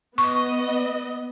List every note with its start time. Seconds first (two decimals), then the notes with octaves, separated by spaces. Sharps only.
0.18 B3 D#5 C#6